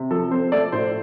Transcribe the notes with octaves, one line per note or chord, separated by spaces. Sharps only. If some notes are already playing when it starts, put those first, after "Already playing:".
Already playing: C3
F3 A4
C4 C5
A3 A4 D5
A2 C5